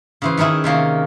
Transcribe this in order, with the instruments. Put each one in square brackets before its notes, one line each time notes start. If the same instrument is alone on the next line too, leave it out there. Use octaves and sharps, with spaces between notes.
[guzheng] C#3 E3 C5
D#3 C#4 D#4 E4 G#4
C3 D#3 A#3 C#4